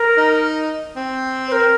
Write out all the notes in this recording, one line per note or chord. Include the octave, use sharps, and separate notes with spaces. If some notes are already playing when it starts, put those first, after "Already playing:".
Already playing: A#4
D#4
C4
C5
A#4